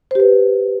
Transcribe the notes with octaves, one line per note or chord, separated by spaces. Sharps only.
G4 B4 C5